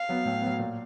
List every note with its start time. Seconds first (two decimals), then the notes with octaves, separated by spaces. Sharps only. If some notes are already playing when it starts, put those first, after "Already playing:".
Already playing: F5
0.09 F#3 B3
0.25 A2
0.42 F#3 B3
0.59 A#2